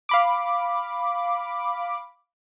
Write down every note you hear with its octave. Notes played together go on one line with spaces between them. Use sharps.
F5 B5 D6